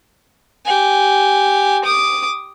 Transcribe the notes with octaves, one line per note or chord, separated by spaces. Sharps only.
G4 G#5
D6 D#6